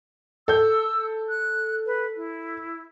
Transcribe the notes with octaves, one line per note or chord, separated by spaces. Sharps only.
A4 E6 G6
F#6
B4
E4